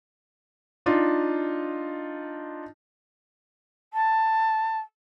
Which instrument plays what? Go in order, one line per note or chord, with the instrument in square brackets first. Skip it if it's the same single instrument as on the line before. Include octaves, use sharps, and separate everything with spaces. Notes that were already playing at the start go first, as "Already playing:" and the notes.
[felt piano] D4 D#4 F4
[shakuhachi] A5